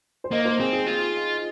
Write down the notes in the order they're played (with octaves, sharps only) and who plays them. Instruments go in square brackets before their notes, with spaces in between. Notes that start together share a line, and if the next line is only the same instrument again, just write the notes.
[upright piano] C5
[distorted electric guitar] A#3 [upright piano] D#5
[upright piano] C5
[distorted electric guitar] C4 [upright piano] G#4
[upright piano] G#4
[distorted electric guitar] F4